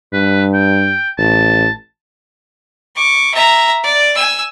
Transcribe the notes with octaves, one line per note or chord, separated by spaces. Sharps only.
G2 B4
G5
A1 A5
C#6 D6
E5 A#5
D5
G#5 E6